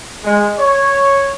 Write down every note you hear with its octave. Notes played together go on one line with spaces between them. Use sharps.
G#3
C#5